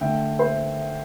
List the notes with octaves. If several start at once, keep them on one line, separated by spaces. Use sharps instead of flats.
D3 A3 E5 G5
C5 E5